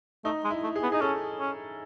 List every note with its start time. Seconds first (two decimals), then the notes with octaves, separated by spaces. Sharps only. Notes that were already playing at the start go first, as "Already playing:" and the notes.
0.25 A3 D#4
0.44 G#3
0.50 E4
0.63 A3
0.76 G#4
0.82 B3
0.92 D#4 G#4
1.01 C#4 A4
1.39 C#4